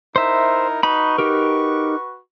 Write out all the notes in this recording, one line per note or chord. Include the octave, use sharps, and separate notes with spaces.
D#4 E4 A#4 C5 E5
D#4 F#4 B4 B5 C#6
D#4 G4 A#4